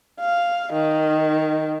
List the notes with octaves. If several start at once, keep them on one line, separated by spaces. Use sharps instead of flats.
F5
D#3